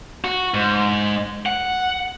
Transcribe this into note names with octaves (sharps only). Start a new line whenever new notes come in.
F#4
G#2
F#5